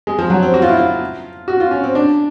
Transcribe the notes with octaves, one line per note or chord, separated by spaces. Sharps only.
G#3
F3
F#3
C4
F#4
F4
E4
F4
F#4
F4
C#4
C4
D4